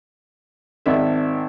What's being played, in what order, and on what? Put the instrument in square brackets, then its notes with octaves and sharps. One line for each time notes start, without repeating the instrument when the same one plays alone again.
[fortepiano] G#1 D5 E5